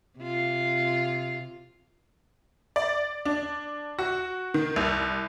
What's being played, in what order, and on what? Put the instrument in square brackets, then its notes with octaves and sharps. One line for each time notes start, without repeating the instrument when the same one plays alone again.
[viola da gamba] C3 F4
[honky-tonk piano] D5
D4
F#4
D#3
C2